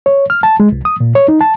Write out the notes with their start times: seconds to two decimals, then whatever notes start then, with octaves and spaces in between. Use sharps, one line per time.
0.06 C#5
0.30 F6
0.43 A5
0.60 G#3
0.72 C2
0.85 D#6
1.00 A#2
1.15 C#5
1.28 D#4
1.41 A5